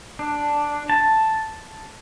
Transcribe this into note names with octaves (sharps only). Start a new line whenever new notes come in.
D4
A5